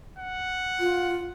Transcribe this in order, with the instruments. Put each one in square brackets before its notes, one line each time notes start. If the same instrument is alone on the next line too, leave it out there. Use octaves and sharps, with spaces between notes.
[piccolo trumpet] F#5
[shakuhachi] F4